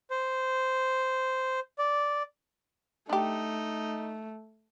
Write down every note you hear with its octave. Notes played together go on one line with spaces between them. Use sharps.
C5
D5
A3 D4 D#4 G4